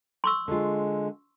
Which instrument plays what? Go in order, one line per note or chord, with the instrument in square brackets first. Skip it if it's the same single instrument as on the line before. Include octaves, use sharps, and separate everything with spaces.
[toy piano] C6 C#6 E6
[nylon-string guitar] D3 F4 [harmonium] G#3